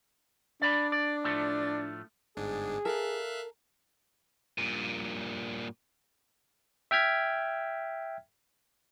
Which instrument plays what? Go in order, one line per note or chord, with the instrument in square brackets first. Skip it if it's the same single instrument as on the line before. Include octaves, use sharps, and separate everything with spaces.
[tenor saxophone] D4 [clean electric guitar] D5 B5
[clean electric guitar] D5
A2 F3 A3
[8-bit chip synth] G1 G#2 D4 [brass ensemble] G#4
[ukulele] A4 A#4 [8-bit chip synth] E5 F5 F#6
[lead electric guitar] G2 A#2
[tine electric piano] E5 G5 F6 G#6 B6